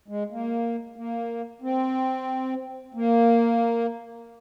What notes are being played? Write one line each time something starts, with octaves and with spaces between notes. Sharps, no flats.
G#3
A#3
A#3
C4
A#3